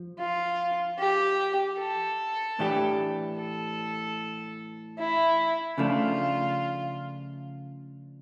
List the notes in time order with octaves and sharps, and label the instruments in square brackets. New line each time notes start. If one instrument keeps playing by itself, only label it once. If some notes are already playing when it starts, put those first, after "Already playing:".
Already playing: [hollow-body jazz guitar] F3
[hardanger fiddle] F4
G4
A4
[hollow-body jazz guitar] A2 E3 A3 D4 G4
[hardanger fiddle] A4
E4
[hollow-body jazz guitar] C#3 F3 A3 D4 [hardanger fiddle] F4